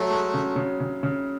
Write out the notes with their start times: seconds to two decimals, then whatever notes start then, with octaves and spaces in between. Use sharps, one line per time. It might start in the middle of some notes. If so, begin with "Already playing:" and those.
Already playing: F#3 A3
0.10 G#3
0.34 C#3
0.56 C#3
0.80 C#3
1.03 C#3